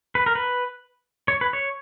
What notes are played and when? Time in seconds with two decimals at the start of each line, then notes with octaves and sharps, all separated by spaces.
0.15 B4
0.26 A#4
0.35 B4
1.28 C#5
1.41 B4
1.53 C#5